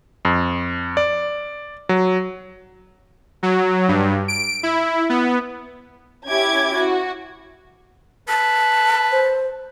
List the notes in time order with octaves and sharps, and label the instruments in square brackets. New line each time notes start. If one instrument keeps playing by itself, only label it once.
[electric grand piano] F2
D5
F#3
[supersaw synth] F#3
G2
D7
E4
B3
[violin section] C#4 E4 G4 D6 G#6
F#4
[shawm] B4 [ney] A5
[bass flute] C5